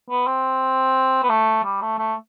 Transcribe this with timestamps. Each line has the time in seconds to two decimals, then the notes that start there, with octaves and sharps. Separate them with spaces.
0.10 B3
0.27 C4
1.23 B3
1.30 A3
1.64 G3
1.82 A3
1.99 A3